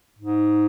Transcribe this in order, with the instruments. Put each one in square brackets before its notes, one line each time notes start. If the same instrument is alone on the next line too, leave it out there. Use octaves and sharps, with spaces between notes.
[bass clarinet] G#2